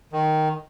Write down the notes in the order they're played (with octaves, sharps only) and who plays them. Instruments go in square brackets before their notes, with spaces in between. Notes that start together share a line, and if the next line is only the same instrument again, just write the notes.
[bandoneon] D#3